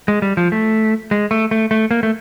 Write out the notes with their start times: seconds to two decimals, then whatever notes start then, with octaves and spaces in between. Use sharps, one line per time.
0.08 G#3
0.22 G3
0.37 F3
0.52 A3
1.11 G#3
1.31 A3
1.51 A3
1.71 A3
1.91 A#3
2.03 A3